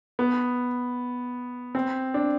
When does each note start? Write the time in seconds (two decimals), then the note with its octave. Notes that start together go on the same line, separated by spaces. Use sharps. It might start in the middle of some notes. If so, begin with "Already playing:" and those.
0.19 B3
1.75 C4
2.14 D4